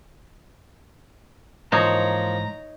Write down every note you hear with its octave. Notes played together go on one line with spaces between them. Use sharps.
G#2 E3 F3 A#3 D#4 C5 C#5 A#5